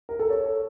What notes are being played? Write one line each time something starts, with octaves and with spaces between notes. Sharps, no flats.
A#4
A4
C#5